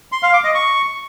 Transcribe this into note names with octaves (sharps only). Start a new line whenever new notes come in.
C6
F5
D6
D#5
C#6